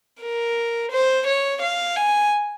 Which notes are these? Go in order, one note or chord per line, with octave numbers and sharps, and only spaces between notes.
A#4
C5
C#5
F5
G#5